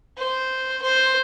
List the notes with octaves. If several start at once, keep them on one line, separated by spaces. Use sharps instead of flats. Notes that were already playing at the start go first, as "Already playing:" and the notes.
C5
C5